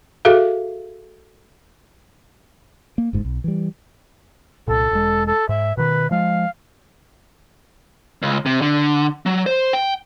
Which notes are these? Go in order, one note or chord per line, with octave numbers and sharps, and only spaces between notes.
F#4 G#4 A4 E5 F5
A#3
F#1 G#2
B1
E3 G3
C2 A#2 A4
E1 G#3
A4
G#2 E5
B2 D#3 B4
F3 G#3 F5
C#2
C3
D3
F#3
C5
G5